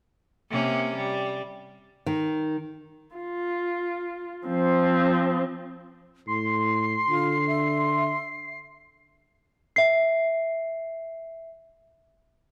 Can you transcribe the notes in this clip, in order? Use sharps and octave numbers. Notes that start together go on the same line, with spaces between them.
C3 A#3 C#4
G3
D#3
F4
F3 C4
A2 C6 C7
D3 F4
E5
E5 C7